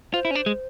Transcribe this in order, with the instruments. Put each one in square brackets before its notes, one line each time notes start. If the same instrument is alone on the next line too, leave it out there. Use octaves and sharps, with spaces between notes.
[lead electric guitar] F4 [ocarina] C5
[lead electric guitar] E4
C#4
D4
G#3